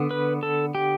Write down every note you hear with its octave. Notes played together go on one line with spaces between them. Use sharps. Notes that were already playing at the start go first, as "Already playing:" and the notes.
Already playing: D3 B3
B4
A4
G4